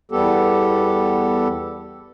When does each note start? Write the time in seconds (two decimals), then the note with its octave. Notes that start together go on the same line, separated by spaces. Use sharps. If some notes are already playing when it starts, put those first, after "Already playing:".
0.12 E2 G3 B3 G4 A4